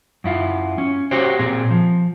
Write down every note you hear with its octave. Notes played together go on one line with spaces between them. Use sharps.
F#2 E4 F4
C#4
F#4 G4 C5 C#5
A#2 C4 G#4
F3